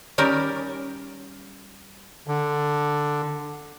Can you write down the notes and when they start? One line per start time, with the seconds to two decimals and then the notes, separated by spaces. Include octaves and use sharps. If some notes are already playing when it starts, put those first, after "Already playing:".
0.18 D#3 G3 C#4 G4 A#4
2.27 D3